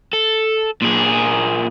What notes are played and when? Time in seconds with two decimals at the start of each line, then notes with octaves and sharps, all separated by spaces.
0.13 A4
0.82 A#2 G#4